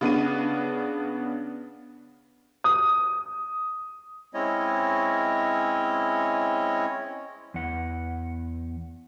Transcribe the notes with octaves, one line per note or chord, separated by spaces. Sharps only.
C#3 B3 D4 D#7
D#6
G#3 C4 C#4 E4 C#5 D#5
E2 F#5